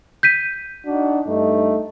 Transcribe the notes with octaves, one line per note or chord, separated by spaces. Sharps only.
G6 B6 D#7
D4 D#4 F#4
G2 A3 D#4